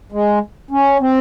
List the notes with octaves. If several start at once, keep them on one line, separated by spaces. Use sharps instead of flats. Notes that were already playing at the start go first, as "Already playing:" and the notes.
G#3
C#4
C4